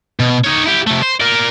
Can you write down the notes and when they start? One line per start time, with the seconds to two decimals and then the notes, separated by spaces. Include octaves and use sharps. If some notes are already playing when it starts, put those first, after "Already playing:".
0.20 B2
0.44 D#4 C#5
0.65 E4 G4
0.87 C3 A3
1.02 C5
1.20 A#4 D5